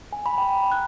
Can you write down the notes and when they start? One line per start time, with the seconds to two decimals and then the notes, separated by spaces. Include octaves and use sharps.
0.13 G#5
0.26 B5
0.38 G5
0.57 A#5
0.72 F#6